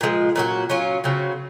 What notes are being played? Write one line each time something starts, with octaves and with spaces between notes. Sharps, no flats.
A#2 F3 G#3
A#2 F#3 C#4 F#4
F#3 C#4 F4
C#3 F#3 C4 F#4